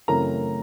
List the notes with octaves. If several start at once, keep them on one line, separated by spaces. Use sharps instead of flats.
F#2 C#3 E3 A3 C4 A#4 A#5